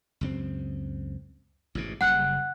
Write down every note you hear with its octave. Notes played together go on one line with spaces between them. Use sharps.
C#2 F#2 C4
A1 G#2 B2
F#1 C#3 G3 F#5 F#6